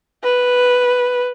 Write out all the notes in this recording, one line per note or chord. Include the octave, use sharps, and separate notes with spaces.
B4